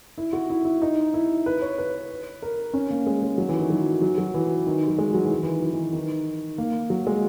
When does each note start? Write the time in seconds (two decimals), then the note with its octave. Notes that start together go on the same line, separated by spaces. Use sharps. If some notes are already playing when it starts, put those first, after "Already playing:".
0.18 E4
0.33 F#4
0.50 E4
0.65 E4
0.82 D#4
1.14 E4
1.46 B4
1.62 C#5
1.78 B4
2.42 A#4
2.74 C#4
2.91 A#3
3.07 G#3
3.22 G#3
3.38 F#3
3.49 E3
3.59 D#3
3.70 F#3
4.02 F#3
4.18 F#3
4.34 E3
4.67 D#3
4.88 F#3
4.98 G#3
5.14 F#3
5.25 E3
5.33 D#3
5.43 E3
5.62 E3
5.73 D#3
5.93 D#3
6.58 A#3
6.90 F#3
7.07 G#3